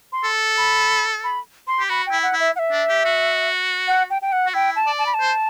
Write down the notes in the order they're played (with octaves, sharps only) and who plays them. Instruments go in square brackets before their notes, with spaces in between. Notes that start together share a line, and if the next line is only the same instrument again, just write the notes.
[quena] C6
[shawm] A4
[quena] B5
B5
C6
[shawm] G4
[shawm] F#4 [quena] B5
[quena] G5
[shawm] E4
[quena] F#5
[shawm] E4
[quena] E5
F#5
E5
[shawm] D4
G4
F#4
[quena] F#5
G5
G5
F#5
[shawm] F#4
[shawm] E4 [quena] G5
[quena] A5
[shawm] D5
[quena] A5
B5
A5
[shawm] C5